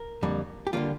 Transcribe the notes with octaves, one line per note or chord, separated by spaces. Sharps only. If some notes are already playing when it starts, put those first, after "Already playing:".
Already playing: A#4
F2 D3 G3 A#3
G4
D3 F3 G3 A#3 F4